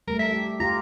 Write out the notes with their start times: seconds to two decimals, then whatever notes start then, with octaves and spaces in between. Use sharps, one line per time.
0.08 G3 A3 A#4
0.19 E5
0.32 G4
0.60 F4 G4 A#5